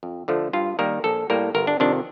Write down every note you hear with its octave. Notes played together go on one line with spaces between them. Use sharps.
F2
D3 F3 A3
G2 F4
D#3 G3 A#3 A#4
A#1 A4
A2 G3 A#3 A#4
G1 A#4
D4
F2 C3 D#3 D4